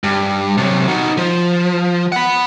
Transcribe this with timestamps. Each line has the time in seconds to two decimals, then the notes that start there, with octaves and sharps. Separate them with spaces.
0.04 G2
0.57 C3 F#3
0.88 D#4 F#4
1.17 F3
2.12 F#5 B5